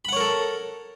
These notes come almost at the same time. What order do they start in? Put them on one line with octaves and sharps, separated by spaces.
B5 F#5 C#5 A#4 A4